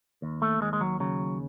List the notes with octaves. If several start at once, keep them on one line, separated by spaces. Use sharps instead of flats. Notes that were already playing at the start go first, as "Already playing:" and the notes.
D#2
A3
D#2 G#3
G#3
F#3
C#3 F#3